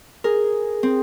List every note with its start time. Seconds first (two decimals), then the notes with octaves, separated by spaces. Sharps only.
0.24 G#4 A#4
0.83 C4